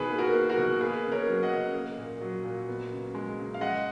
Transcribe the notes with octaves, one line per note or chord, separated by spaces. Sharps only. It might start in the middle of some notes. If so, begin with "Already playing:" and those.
Already playing: B2 D#3 G#4 B4
A#3
F#4 A#4
A#3
F#4 A#4
B2
A#3 G#4 B4
C#3
A#4 C#5
F#3
D#5 F#5
C#3
A#3
A#2
F#3
A#2
B3
C#3
G#3
C#3
F5
G#3 D#5 F#5